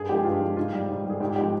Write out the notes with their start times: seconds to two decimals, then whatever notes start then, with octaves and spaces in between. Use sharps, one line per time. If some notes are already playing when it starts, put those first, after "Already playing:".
Already playing: G2 G#4
0.09 F3 G#3 G4
0.25 G2 F4
0.41 F3 G#3
0.56 G#2 F4
0.73 G3
0.89 G#2
1.04 G3
1.10 G#4
1.20 G#2 G4
1.36 F3 G#3 G4